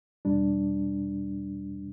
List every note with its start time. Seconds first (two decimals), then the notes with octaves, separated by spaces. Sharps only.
0.25 E2 B2 G3 D4